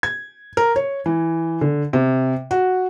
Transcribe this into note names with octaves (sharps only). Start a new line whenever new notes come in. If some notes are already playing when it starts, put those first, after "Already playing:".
G#6
A#4
C#5
E3
D3
C3
F#4